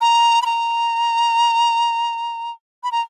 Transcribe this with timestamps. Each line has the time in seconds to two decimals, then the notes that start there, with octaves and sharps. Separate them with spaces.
0.01 A#5
0.42 B5
0.46 A#5
2.83 B5
2.92 A#5